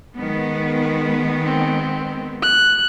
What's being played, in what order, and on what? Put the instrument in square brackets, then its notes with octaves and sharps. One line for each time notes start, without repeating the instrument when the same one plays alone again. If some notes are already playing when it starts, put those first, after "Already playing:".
[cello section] D#3 G#3 B3
[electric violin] C4
F#6